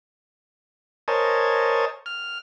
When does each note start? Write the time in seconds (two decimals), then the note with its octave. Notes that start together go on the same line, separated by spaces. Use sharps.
1.08 A#4 C5 C#5 D#5 G#5 A5
2.06 F6